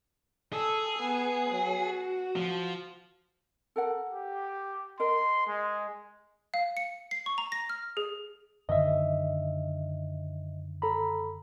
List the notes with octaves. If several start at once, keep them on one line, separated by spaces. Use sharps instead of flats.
G#4 A4
B3
F#3
F#4
F3
A4 A#4 F#5
G4
A#4 D#5 C6
G#3
F5
C#7
C7
C#6
A#5
A#6
F6
G#4
F#2 D3 D#3 D#5 E5
A4 A#5 B5